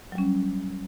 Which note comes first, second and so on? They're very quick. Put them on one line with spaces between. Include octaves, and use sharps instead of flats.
F#3 G3 C#4